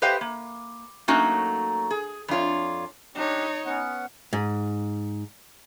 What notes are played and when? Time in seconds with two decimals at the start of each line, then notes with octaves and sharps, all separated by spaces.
0.02 G4 B4 C5 D#5 F5 G5
0.21 A#3
1.08 F#3 A3 A#3 C#4 D#4 F#4
1.91 G#4
2.28 F2 D4 F4 C#5
3.15 D4 D#4 G4 C#5
3.65 B3 C#4 F#5
4.33 G#2